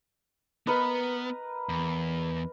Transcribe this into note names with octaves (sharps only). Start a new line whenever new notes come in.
B3 A#4 B4 D#5
E2